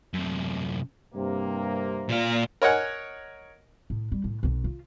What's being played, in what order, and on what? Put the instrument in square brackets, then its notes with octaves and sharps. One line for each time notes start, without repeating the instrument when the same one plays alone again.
[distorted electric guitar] F#2 C3
[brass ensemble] G2 C3 A#3
[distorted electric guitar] A#2 F5
[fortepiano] A#4 C#5 D#5 F#5 G#5
[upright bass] A2
G3
A2
B1 B2
F4